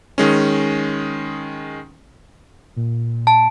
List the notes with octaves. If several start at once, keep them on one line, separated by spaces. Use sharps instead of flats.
D#3 G#3 C#4
A#2
A5